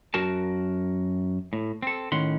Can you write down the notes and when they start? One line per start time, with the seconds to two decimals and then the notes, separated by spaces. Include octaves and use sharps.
0.14 F#2 F#4 A#4 A5
1.53 A2
1.83 C4 A4
2.12 A2 D#3 C#4 F#5 C6